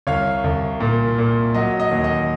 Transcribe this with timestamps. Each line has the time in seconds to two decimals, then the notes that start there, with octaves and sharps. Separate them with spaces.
0.07 C2 C#5 F5
0.44 C2
0.80 A#2
1.18 A#2
1.54 F#3 D#5
1.80 D#5
1.91 D#2
2.04 D#5